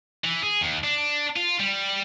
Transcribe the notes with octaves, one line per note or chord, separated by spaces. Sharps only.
E3
G#4
D#2
D4
F4
G3